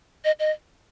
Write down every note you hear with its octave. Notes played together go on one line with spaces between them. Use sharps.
D#5
D#5